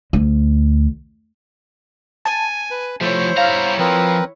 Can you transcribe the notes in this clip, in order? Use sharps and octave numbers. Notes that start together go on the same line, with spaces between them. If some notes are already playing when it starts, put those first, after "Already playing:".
D2
G#5 A5
B4
F3 A3 E4 C5 C#5
G3 F5 A#5
F3 C4 A#4 B4